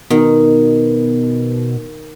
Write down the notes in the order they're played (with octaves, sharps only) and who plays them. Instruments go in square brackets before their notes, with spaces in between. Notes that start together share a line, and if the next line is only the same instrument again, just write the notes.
[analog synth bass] B2 [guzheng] D#3